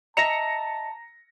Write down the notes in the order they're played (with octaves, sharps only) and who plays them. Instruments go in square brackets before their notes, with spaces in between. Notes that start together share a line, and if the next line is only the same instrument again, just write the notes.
[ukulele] D#5 E5 [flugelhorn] A5 [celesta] A#5 E7 F7 [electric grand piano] A#6 C#7